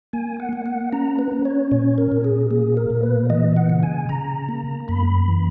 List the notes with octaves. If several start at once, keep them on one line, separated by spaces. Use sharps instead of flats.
A#3 G#5
F#5
A#3
F#5
C#4 A#5
B4
C#4
C#5
A#2 C#5
A#4
A#2
G#4
A#3 G#4
A#4
A#2
B4
E3 D#5
F#5
C#3
G#5
C#3 A#5
A#3
F#2 B5
E3